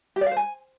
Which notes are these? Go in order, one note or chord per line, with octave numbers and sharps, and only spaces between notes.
G4
D5
F5
C5
G#5